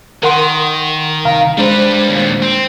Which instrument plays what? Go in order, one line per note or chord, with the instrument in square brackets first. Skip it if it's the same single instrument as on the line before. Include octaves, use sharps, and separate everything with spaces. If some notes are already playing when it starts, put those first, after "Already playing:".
[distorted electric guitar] D#3 [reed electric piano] A#4 F#5 C6
[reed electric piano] C2 F5 A#5
[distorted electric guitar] G3 B4 [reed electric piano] G#3 D4 C5
[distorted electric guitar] D#2 A#2
C4